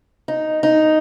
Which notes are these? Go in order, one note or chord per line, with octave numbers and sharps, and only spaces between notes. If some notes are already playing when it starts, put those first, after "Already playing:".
D#4
D#4